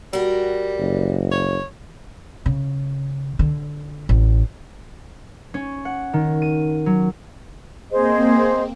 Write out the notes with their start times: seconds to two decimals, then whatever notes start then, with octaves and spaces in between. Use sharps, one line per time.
0.13 G3 F#4 A#4
0.79 F#1
1.32 C#5
2.46 C#3
3.39 D3
4.09 A1
5.54 C#4
5.85 F#5
6.13 D#3
6.42 D#7
6.86 F#3
7.91 A#3 C4 G#4 C5 D#5